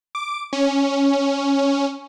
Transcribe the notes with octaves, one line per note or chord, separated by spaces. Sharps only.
D6
C#4